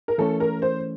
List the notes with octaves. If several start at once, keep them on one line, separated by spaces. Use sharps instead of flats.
A#4
E3 A3 C#4 A4
A#4
C5